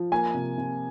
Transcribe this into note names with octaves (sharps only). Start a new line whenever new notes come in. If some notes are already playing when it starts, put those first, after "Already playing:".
Already playing: F3
A#3 G#5
C3
C3